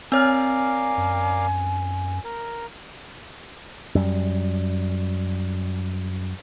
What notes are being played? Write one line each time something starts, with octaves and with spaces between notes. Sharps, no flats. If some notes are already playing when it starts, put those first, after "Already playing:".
C4 A#4 C#5 D5 F5 G#5 F6
F#2
A#4
F#2 G3